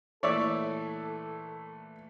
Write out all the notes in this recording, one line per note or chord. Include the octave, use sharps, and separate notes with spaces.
A#2 E3 A3 A4 C#5 D5 E5